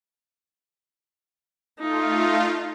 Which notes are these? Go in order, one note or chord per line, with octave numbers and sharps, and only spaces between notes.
A3 D#4 F4